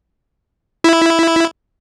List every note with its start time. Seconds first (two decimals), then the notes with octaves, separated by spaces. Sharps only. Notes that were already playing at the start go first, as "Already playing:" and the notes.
0.84 E4